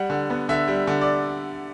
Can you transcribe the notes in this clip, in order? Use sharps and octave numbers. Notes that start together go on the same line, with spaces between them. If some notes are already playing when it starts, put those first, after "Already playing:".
Already playing: G3 F#5
D3
B3
D3 E5
G3
D3
D5